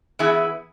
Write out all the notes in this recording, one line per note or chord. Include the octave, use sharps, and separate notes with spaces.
E3 B3 E4 G#4